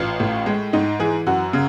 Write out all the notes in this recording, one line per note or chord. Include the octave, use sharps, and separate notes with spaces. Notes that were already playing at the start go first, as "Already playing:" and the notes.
Already playing: A1 F4
A2
G#3
G#2 D#4
E3 G#4
F#2 F#4
C#3